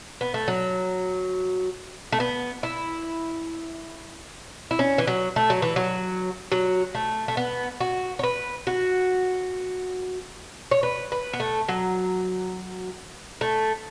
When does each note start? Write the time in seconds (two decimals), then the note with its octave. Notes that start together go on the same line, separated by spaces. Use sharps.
0.21 B3
0.34 A3
0.48 F#3
2.12 A3
2.20 B3
2.63 E4
4.71 E4
4.79 C#4
4.98 E3
5.07 F#3
5.36 A3
5.50 F#3
5.62 E3
5.76 F#3
6.52 F#3
6.95 A3
7.28 A3
7.37 B3
7.80 F#4
8.19 C#5
8.24 B4
8.67 F#4
10.71 C#5
10.83 B4
11.12 B4
11.33 B3
11.40 A3
11.68 F#3
13.41 A3